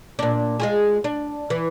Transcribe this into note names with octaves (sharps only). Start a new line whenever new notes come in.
A#2 D4
G#3 F4 G#4
D4
E3